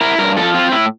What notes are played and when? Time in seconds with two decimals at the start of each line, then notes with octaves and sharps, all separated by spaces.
0.01 E4 A#4
0.19 G2 A#4
0.37 F3 A4
0.54 C4 F4
0.72 A2 E4